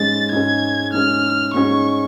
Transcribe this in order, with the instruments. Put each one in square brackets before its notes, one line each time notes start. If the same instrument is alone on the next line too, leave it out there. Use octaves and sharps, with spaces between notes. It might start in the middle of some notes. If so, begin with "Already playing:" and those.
Already playing: [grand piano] G#2 G#3 C#4 G#4 [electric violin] A6
[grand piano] G#2 G#3 C#4 G#4 [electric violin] G#6
[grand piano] G#2 G#3 C#4 G#4 [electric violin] F6
[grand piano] G#2 G#3 C#4 G#4 [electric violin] C#6